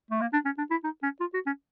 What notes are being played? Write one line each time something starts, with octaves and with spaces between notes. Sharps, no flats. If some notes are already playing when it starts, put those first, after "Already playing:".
A3
A#3
D4
C#4
D4
E4
D#4
C#4
F4
F#4
C#4